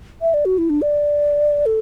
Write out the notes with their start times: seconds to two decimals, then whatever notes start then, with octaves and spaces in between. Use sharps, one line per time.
0.22 E5
0.34 D5
0.45 F#4
0.58 E4
0.70 D4
0.82 D5
1.66 A4